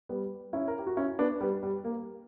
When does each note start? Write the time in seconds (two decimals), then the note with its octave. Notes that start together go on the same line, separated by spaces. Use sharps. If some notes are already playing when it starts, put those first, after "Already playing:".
0.09 G3 B3
0.53 C#4 E4
0.68 A#4
0.78 G4
0.87 F#4
0.97 C#4 E4
1.19 B3 D4
1.40 G3 B3
1.63 G3
1.84 A#3